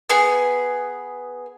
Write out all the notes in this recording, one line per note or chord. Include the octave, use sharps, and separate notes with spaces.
B3 G#4